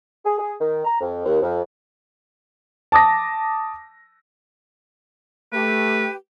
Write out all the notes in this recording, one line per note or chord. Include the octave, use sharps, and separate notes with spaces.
G#4
G#4
D#3
A#5
F2
D#2
F2
A5 D6 D#6 A#6
A3 G4 B4